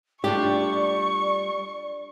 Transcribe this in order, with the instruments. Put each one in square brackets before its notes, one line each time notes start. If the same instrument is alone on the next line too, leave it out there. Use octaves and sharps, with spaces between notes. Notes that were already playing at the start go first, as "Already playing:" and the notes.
[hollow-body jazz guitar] G3 A3 F4 [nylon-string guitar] D4 G4 [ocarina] D5 [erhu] C#6